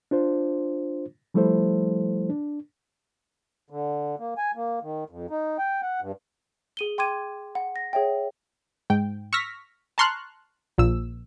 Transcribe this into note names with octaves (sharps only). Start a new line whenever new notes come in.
D4 F4 C5
F3 G3 A3 E4 A4 C5
D4
D3
A#3
G#5
A#3
D#3
F2
D#4
G5
F#5
G2
G#4 D#7 G7
G5 C6 D6 G#6 D#7
F#5
A#6
G#4 C#5 E5 G5
G#2 G5
C#6 E6 F6 A#6 B6
A5 A#5 C6 C#6 F6 F#6
A#1 A#2 F3 E6